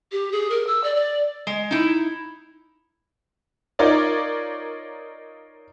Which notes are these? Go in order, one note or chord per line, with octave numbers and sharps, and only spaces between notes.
G4
G#4
A#4
E6
D5
D5
G#3
D#4 E4
D#4 F4 A#4 C#5 D5